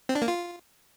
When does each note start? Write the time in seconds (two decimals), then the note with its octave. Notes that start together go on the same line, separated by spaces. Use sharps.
0.09 C4
0.15 D4
0.22 A#3
0.28 F4